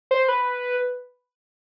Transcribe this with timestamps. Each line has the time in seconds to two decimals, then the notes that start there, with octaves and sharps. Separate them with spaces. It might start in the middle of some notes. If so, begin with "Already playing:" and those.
0.11 C5
0.28 B4